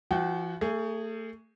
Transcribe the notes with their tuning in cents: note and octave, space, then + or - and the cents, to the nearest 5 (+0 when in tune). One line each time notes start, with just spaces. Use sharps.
F3 -40 F#4 +0 G5 +0
A3 +30 G#4 -5